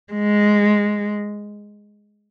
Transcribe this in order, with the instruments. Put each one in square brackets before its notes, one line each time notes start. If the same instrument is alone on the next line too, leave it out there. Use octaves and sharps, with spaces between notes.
[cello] G#3